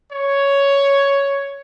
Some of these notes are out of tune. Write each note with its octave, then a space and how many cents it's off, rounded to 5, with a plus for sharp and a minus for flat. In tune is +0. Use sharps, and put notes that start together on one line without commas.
C#5 +5